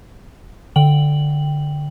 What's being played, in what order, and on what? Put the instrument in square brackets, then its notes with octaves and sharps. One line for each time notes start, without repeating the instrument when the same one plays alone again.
[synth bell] D3 G5 F#7